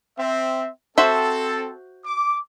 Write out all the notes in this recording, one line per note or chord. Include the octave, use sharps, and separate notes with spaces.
C4 E5
C4 F#4 A4 C5 E5
D6